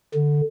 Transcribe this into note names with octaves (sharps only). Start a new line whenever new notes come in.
D3